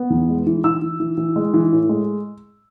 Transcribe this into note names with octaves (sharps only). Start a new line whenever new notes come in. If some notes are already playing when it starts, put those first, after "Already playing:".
Already playing: B3
E2
G#3
E3
E3 E6
E3
E3
E3
G#3
E3
A2
G#3